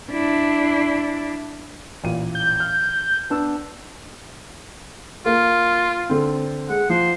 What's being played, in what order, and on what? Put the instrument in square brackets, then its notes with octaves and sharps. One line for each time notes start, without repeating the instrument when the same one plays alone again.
[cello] D4 E4
[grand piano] A1 A#2 D#7
[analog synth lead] G6
[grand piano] F6
B3 D4 E6
[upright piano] A#3 [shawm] F4
[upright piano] D3 C4
[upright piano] G#3 [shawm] F#5
[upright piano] F3 [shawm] C5